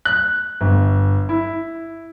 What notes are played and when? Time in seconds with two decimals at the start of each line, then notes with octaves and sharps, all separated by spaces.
0.05 F#6
0.61 G1
1.29 E4